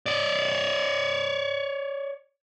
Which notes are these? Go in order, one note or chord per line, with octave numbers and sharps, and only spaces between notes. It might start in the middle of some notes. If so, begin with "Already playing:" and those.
C#5 D5